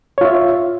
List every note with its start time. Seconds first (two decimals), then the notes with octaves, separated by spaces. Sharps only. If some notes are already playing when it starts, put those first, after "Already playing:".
0.18 C#5
0.21 F4
0.25 E5